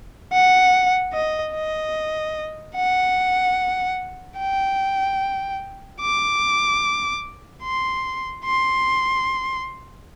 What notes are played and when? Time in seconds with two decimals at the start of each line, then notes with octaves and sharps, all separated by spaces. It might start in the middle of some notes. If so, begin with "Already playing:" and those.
0.32 F#5
1.13 D#5
1.54 D#5
2.75 F#5
4.38 G5
6.01 D6
7.63 C6
8.45 C6